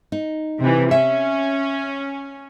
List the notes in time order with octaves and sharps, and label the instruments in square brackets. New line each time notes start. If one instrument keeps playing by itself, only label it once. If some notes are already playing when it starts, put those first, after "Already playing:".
[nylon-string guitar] D#4
[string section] C3 E3
[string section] C#4 [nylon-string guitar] E5